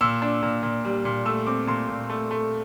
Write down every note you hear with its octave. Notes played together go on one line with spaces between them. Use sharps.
A#2 E6
D4
A#2
A#2
G3
A#2
A3 E6
C4 D6
A#2 C6
A#2
A3
A3